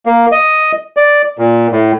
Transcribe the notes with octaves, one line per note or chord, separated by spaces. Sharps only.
A#3
D#5
D5
A#2
A2